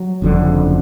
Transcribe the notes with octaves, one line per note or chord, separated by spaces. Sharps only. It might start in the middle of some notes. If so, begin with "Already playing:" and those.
Already playing: F#3
F#1 F2 D3